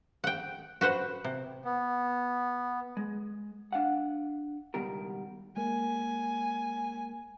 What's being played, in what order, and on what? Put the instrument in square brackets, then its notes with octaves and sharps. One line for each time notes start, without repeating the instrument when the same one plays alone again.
[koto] F#5 G5
F#4 B4 C5 F#5
C3
[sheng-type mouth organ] B3
[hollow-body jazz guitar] G#3
D4 F5 F#5
C#2 B2 D#3 G3 A#4
[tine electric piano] G#3 A#3 A#4 [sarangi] G#5